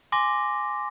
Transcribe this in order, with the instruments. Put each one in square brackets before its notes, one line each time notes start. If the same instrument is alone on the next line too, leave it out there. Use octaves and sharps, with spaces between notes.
[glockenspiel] G#5 C6 D6 A#6